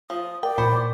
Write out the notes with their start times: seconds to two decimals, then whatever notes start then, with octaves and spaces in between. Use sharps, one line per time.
0.10 F3 D#6
0.43 A#4 D5 G5
0.58 A#2 C5 B5 C#6 G6